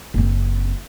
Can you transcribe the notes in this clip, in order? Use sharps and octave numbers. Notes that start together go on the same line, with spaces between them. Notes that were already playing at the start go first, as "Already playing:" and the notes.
F#1 C4